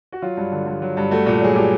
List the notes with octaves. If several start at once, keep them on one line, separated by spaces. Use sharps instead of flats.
F#4
F#3 F4
G2
D3
G2
F#3
G2
A3 F#4
A#2
F#3 G#4
A#2 G4